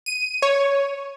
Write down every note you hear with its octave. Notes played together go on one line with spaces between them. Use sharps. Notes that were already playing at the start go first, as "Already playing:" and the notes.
D#7
C#5